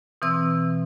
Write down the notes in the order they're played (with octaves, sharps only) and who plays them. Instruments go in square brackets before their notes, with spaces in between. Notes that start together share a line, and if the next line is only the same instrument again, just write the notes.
[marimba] B2 E3 C4 E6